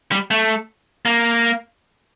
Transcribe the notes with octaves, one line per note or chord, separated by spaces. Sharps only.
G3
A3
A#3